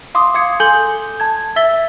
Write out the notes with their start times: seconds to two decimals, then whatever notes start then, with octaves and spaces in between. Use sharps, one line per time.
0.15 F5 C6 D6 D#6
0.35 F5 D6 D#6 G#6 C#7
0.60 A4 G#5 C6 G6 F#7 G7
1.20 A5 G#6
1.56 E5 E6 A6 B6 G7